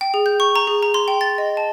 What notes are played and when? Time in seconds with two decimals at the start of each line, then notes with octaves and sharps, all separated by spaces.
0.01 G5
0.14 G#4
0.26 G6
0.40 C#6
0.56 A#5
0.67 G#4
0.83 A#5
0.94 C6
1.08 G5
1.21 A6
1.38 D#5
1.57 A5